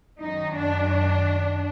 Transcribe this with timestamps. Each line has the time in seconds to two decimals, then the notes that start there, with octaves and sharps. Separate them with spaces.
0.20 F#2 D#3 D#4
0.56 D4